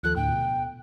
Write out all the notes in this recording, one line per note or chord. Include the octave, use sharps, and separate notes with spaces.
D#2 F3 A4 F#6
D2 A2 D3 G5
B2